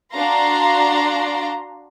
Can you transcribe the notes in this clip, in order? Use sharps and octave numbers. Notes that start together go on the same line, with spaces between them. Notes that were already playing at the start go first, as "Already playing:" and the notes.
D4 F#4 F5 A#5 C6